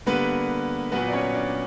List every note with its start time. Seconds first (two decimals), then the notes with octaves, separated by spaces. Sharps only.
0.06 D3 G3 A#3 B3 B4
0.91 A#2 F#3 A#3 B3 B4
1.08 D5
1.13 C#4 C#5
1.34 D4 D5